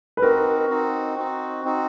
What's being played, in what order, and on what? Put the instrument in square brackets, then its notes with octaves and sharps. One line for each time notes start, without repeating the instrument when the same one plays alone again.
[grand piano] B4
[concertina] C4 D#4 F#4 [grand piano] A#4
[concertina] C4 D#4 F#4
C4 D#4 F#4
C4 D#4 F#4